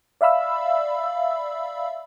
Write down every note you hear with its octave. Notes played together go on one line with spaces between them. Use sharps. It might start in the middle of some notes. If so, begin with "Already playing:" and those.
D5 E5 F5 B5 E6